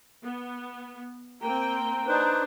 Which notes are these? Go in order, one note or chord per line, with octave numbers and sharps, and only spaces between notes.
B3
A#3 C4 G5 A#5
D4 D#4 B4 C5